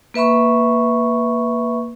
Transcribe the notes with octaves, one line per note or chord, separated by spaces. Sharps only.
A#3 B4 E5 B5 C#6